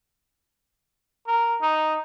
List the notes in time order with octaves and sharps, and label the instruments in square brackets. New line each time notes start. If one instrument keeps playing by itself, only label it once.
[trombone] A#4
D#4